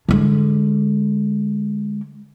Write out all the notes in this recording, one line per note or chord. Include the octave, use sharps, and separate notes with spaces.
D3 G#3